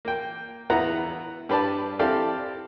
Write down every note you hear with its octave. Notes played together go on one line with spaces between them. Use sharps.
A#3 G5
E2 B3 E4 F#5 A#5
G2 G4 B4 D5 A5
C4 E4 G4 A4 D5 F5